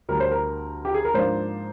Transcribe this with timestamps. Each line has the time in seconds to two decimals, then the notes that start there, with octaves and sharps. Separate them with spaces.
0.08 D2 D3 G3 A#4
0.20 C5
0.31 A#4
0.85 G4
0.94 G#4
1.05 A#4
1.14 G#2 F3 A#3 D4 C5